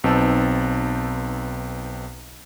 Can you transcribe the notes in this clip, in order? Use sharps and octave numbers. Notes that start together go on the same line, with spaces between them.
B1 C4 D#4 B4 A5 E6